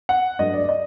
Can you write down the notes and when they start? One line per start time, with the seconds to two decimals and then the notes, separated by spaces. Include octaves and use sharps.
0.09 F#5
0.39 G2 F#3 A3 D#5
0.54 D5
0.64 D5
0.69 D#5